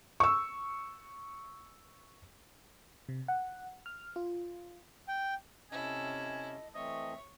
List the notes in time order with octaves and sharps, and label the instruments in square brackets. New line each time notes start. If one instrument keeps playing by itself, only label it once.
[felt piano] C#6 E6
[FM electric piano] C3
F#5
F6
F4
[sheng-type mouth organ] G5
[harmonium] C3 C#4 [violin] E4 A4 [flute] D#5 [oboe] G#5
[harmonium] E3 A3 C4 [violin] C#5 [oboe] D#5 [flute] E5